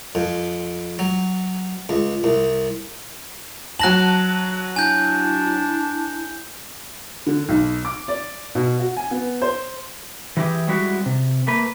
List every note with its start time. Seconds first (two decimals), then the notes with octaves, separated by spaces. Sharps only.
0.15 F2
0.99 F#3
1.89 C#2
2.24 C2
3.79 F#3 A5 F#6 A#6 F#7
4.76 D4 E4 G#5 G6
7.27 D3
7.49 B1
7.85 D6
8.08 D5
8.55 B2
8.80 F#4
8.97 G#5
9.11 B3
9.42 C5
10.37 E3 F#3 E4 G4 G#4
10.68 G3 G#3 C4 E4 F#4
11.06 C3
11.47 A3 A#3 B4